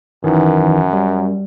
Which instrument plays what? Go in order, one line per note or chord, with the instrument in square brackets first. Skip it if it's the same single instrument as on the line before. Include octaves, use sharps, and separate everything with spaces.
[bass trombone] F#2 [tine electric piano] D#3 E3
[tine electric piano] G3